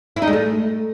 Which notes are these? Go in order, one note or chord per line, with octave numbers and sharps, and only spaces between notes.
E4
D#4
G#3
A3